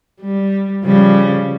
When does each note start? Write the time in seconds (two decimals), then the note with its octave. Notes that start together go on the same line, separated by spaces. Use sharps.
0.21 G3
0.84 C#3 F3 G3